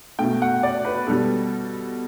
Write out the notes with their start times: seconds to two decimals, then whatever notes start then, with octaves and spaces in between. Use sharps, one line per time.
0.19 B2 A3 G5
0.42 F#5
0.63 D5
0.85 B4
1.07 B2 G3 A4